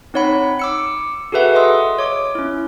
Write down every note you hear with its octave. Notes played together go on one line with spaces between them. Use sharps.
C4 D#4 C#5 F#5 B5
D6 E6 C#7
F#4 G#4 A4 B4 E5 F#5
D#5 C6 D#6 E6
C#5 D6
C#4 E4